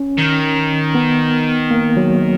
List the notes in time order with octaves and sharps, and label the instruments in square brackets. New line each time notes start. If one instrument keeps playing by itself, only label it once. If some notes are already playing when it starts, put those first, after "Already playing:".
Already playing: [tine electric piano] C#4
[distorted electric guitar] D#3
[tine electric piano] B3
A#3
F#3